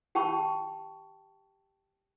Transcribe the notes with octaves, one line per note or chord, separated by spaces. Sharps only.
G4 G5 A5 B5 C#6